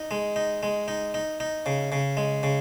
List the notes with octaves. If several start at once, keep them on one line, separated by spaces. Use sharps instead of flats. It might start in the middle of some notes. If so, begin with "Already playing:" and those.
Already playing: D#4
G#3
D#4
G#3
D#4
D#4
D#4
C#3
C#3
G#3
C#3